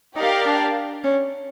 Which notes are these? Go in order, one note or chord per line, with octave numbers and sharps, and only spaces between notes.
D#4 G4 A#4 D5 F5
D4
C#4